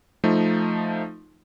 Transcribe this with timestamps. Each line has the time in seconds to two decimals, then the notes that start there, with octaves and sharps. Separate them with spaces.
0.24 F3 A3 D#4